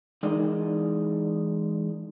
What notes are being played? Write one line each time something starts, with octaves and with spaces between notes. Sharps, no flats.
E3 G#3 D#4 A#4 D5 D#5